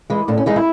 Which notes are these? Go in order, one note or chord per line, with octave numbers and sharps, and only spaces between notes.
E3 G#3
A2 D4
C#4
E3 G#3 D#4
E4